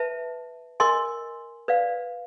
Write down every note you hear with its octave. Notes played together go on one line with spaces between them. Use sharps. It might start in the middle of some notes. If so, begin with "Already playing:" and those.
Already playing: B4 E5 A5
A#4 D#5 G#5 C6
B4 D5 F5